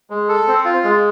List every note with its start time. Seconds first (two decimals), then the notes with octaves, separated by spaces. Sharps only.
0.10 G#3
0.29 A4
0.48 C4
0.65 F4
0.84 G#3